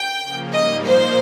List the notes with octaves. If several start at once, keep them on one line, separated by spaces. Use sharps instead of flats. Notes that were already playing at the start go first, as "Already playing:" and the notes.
Already playing: G5
C#3 F3 A#3
G#2 G3 A#3 D#4 D#5
A#2 F3 A#3 D#4 C5